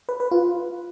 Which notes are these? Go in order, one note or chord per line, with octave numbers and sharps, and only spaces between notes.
B4
B4
F4